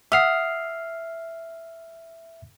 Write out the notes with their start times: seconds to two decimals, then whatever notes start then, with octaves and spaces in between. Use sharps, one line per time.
0.12 E5 F#5 D#6 F6 C7